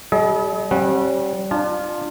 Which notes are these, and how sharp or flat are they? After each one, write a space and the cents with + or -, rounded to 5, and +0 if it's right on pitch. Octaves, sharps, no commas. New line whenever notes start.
G3 -20 G#4 +45 D#5 +30
G3 -20 C#4 -45 F#5 +0
D4 +35 F4 +0 A5 -45